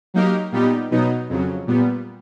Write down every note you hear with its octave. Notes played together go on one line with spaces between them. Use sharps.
F#3 A#3 D#4 G4 A#4
A#2 G3 B3 D#4 G4
B2 F#3 B3 D#4
F2 C#3 F#3
A#2 G3 B3